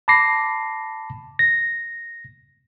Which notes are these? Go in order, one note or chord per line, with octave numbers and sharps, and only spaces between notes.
A5 B5 D6 A#6 C7
A#6